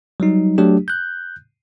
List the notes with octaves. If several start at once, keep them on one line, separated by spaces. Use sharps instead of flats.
F#3 G3 D#4
F#3 A3 D4 G4
F#6 G6